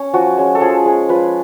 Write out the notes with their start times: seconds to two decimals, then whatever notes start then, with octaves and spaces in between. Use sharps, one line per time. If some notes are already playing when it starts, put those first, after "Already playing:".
Already playing: C#4
0.14 F3 F#4
0.37 G#3 C#4
0.55 A4
0.61 F3 G#4
0.86 G#3 C#4
1.09 F3 B4